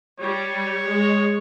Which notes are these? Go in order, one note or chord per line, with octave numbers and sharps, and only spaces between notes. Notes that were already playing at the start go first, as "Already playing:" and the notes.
G3 C#5
G#3